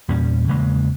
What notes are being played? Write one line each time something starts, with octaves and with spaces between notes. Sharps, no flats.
E2 A#2 G3 C#4
E2 C#3 G#3 A#3